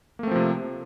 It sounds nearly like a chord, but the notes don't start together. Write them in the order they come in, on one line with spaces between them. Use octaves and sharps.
A#3 A3 C4 F3 C3